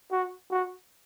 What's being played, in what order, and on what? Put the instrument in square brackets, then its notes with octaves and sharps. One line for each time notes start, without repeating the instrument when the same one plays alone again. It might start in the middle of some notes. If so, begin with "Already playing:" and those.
[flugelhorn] F#4
F#4